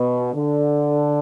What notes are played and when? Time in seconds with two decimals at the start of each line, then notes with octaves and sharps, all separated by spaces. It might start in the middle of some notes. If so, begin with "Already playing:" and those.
Already playing: B2
0.35 D3